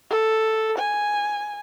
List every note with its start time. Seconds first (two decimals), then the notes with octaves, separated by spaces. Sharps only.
0.11 A4
0.78 G#5